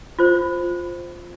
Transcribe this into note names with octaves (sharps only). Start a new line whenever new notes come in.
F4 C5